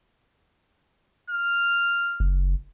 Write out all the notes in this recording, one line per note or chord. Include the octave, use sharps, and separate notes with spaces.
F6
F#1